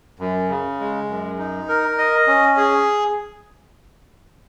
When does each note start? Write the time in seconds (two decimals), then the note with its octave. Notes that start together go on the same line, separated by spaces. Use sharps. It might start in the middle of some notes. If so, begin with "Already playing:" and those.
0.19 F#2
0.49 C#3
0.80 G#3
1.09 F#2
1.38 D#4
1.69 A#4
1.98 D#5
2.27 C#4
2.57 G#4